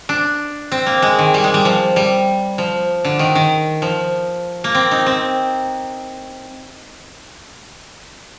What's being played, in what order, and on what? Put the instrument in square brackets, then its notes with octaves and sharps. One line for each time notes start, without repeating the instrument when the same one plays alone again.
[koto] D4
C4
A#3
G#3
D#3
G3
G#3
G3
F3
G3
F3
D3
D#3
D#3
F3
A#3
C4
D#4
C4